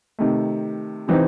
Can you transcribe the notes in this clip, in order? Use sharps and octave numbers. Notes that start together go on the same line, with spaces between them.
C3 D#3 A3
C3 E3 C4 D#4